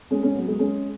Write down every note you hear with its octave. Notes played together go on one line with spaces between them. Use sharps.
G#3 C#4
G#3 C#4
F#3 B3
G#3
G#3 C#4